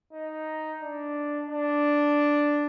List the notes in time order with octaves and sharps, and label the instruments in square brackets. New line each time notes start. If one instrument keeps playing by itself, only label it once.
[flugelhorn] D#4
D4
D4